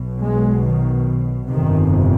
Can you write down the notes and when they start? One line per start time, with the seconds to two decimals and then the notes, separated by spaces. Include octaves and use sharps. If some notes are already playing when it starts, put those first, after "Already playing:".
Already playing: B1 B2
0.21 G#3
0.65 D#3
1.52 G1 F2 C3 D#3